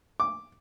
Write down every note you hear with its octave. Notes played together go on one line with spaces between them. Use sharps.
D6